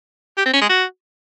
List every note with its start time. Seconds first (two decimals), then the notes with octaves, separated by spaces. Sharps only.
0.37 G4
0.45 C4
0.53 C#4
0.61 G#3
0.69 F#4